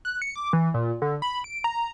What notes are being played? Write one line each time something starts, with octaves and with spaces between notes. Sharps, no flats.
F#6
C#7
D6
E3
A#2
D3
B5
D7
A#5